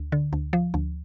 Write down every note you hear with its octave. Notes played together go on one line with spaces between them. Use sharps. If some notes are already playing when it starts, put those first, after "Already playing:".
Already playing: D2
D3
D2
F3
D2